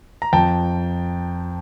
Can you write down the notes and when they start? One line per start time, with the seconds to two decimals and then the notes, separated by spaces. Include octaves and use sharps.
0.22 A#5
0.33 F2 G5 A5